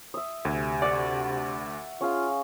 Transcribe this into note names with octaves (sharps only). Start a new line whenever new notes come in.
E5 D#6
D2 C3 G#5
D5 E5 F#5 C#6
C#4 F4 G#4 F5